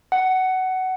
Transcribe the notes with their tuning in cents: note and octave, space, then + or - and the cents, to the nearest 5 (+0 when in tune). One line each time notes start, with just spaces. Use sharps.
F#5 +20